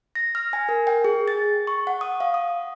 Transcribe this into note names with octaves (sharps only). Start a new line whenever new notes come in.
A#6
F6
G#5
A#4
G5
G#4
A6
C#6
F#5
D#6
F5
D#6